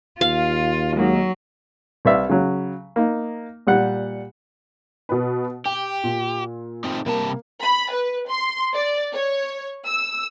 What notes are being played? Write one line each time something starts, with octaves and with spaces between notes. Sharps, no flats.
D#2 F4 F5
F#3 G#3 A#3 D#4
C2 B4 D5 E5 F5
C#3 F#3
A#3 D#4
A#2 G3 F#5
B2 B4
G4 G5
A#2
A3 C4 D#4
C3 G3 A#3 A5
B5
B4
C6
D5
C#5
E6